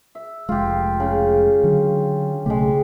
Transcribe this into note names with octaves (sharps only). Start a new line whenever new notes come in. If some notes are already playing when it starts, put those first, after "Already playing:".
E5
F1 G#3 F4 G4
C#3
D3 F#3
B1 C#3 G#3 A3 G4